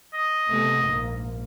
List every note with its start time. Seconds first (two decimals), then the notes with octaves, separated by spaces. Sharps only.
0.13 D#5
0.48 C3 A3 B3
0.83 A#1 G#2 A#3